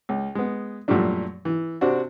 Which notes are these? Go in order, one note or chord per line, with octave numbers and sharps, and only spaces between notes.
C#2
G#3 B3
F#2 A#2 F3 G3 A3 D4
E3
C3 C4 D4 F#4